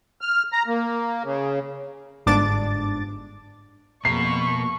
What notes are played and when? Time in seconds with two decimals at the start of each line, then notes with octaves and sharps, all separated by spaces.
0.21 F6
0.52 A#5
0.67 A#3
1.24 C#3
2.26 G1 G#2 D4 D6 A6
4.05 F2 B2 A#3 C#6 C7